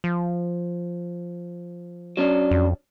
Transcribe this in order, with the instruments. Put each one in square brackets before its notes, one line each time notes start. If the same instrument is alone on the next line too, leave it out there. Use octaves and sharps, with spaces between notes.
[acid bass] F3
[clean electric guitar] F#3 C#4 D4
[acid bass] F2